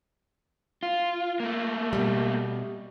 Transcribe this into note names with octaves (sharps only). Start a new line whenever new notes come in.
F4
A3 A#3
B2 G3